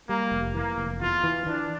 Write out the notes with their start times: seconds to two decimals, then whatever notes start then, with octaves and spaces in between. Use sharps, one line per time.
0.09 G3 A#3
0.32 F1
0.54 E3 A#3
0.78 F1
1.01 E2 F4
1.24 E3
1.47 E3 D4